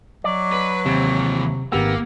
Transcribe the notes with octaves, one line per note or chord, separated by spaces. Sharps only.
F#3 D5 D#5
B4
D#2 C3 E3 C4
G#1 A#3 B3 G4 E6